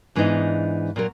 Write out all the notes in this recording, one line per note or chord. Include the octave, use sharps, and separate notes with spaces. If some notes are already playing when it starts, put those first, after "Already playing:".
G#2 E3 B3 D4 D#4 D#5
A#2 F#3 A#4